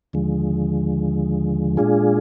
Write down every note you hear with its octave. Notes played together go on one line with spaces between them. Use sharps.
D#2 D3 F3 G#3
A#2 G#3 D4 F4 G#4